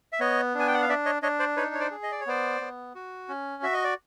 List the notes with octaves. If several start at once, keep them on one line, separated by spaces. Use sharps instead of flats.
E5
B3 C#5 D#5
D4
G#5
G5
F#5
F5
D4 D5 E5
C#5 D#5
D4 C#5 D#5
C5 D5
D#4 B4 C#5
C#5
C5 D5
G#4
D#5
D5
C#5
B3 C5 D5
B3
F#4
C#4
F#4 E5
D#5
D5